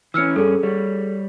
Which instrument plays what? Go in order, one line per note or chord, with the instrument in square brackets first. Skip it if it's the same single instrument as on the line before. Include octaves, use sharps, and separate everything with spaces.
[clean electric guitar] E3 C#4 [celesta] E6 F6 C#7
[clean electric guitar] G2 C#4 [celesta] G#4 A4
[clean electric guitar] G3 C#5